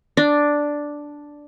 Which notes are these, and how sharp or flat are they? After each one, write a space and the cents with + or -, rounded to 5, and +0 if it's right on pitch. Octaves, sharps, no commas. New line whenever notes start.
D4 +0